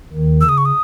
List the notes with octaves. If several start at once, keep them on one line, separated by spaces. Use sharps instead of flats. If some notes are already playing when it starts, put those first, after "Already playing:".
D#2 D#3
C#3 E6
D#6
C#6
D#6